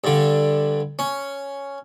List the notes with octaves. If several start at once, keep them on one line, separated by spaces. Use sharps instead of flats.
G2 D3
C#4